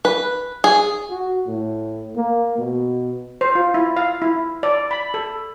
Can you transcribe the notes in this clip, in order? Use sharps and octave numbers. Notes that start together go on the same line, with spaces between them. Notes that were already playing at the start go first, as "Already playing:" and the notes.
B4
G#4
F#4
A2
A#3
B2
C5
F4
E4
F5
E4
D5
B5
A4